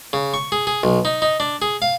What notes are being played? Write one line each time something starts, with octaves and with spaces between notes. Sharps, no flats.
C#3
C#6
G#4
G#4
B1
D#4
D#4
D4
G#4
F5